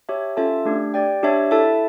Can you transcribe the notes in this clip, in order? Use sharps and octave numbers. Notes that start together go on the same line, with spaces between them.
G4 C#5 E5 A5
C#4 F4 A4 E5 A5
A3 D4 G4
G4 D5 G5
D4 G4 C#5 E5 A5
E4 A4 E5 A5